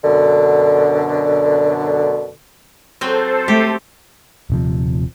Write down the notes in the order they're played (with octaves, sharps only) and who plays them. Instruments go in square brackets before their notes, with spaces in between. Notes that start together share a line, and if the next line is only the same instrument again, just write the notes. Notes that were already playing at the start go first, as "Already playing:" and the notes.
[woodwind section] F#2 B2 D3
[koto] F#3 C4 [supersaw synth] A4 C5
[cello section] A3 [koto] G4
[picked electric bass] D#1 C3 F3